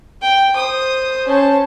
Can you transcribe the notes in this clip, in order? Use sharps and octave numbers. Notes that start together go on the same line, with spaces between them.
G5
C5 D#6
C#4 A5